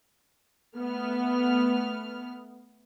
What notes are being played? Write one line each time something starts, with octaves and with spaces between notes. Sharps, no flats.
A3 B3 F6